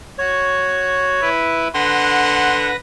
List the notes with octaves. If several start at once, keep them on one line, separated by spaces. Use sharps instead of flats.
F#4 C#5
E4 B4
D3 B4 F#5 C6 A#6